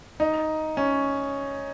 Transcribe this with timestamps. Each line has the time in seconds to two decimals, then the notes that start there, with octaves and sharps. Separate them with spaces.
0.20 D#4
0.77 C#4